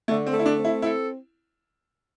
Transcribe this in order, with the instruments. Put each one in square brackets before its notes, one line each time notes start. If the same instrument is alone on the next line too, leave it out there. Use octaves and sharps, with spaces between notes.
[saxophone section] D3 [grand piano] A3
[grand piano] C4
[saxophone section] A3
[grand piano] E4
D4
[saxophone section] C4
[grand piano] E4
[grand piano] E4 [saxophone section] A4